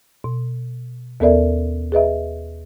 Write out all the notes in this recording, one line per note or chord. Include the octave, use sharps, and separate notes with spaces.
B2
D#2 B3 A4 A#4 D5 E5
G#4 B4 D#5 E5